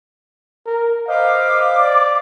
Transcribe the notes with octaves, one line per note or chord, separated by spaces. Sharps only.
A#4
B4 C5 D#5 F5 D6
D5